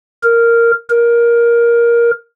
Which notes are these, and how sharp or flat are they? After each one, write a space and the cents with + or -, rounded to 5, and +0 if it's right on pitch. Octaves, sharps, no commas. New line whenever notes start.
A#4 -5
A#4 +15